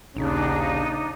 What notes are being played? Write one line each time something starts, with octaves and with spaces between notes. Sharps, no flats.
A#1 D#2 C#3 D4 D#4